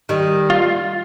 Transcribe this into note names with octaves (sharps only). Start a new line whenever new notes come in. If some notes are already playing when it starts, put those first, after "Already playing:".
D#3 G3
F4